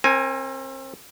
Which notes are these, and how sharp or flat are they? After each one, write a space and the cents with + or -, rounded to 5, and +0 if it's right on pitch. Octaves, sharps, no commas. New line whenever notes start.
C4 +35 A#4 +0 G#5 +0